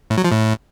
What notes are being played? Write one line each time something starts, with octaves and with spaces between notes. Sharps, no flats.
A2
F#3
F3
A2